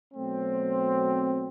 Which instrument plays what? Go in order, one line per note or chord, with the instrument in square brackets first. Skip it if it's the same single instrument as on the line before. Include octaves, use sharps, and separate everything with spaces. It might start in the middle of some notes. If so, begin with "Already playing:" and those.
[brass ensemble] B2 F#3 A3 C4